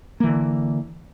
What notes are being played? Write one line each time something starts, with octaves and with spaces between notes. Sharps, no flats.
D3 E3 A#3